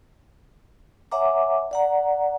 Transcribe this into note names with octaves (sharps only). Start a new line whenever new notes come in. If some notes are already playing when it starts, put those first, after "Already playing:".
C#5 E5 F#5 G#5 A#5 D6
D5 F#5 A#5